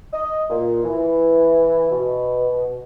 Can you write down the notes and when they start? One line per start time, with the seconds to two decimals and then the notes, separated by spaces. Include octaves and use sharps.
0.13 D#5
0.50 A#2
0.83 E3
1.91 B2